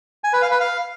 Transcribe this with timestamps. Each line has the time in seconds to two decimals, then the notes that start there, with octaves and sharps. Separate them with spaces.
0.24 G#5
0.33 B4
0.42 F5
0.51 B4
0.60 F5